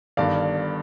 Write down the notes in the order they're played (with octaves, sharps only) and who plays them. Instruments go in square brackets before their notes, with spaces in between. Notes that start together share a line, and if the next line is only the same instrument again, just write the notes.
[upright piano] G1 G2 D#3 D5 F5